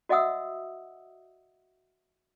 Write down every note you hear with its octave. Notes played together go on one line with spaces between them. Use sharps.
F#4 D#5 E5 F#5 D#6 E6